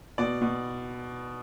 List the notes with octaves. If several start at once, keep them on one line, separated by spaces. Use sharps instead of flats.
B2 D5
B2